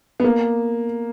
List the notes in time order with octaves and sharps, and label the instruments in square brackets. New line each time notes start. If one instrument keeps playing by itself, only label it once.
[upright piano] B3
A#3